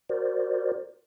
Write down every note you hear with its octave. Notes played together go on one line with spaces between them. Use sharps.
F#4 A#4 C5 D5